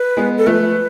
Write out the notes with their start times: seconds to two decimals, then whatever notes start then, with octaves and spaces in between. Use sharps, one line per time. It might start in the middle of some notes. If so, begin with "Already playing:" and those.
Already playing: B4
0.17 G#3 B3
0.38 A4
0.47 F3 A3 B4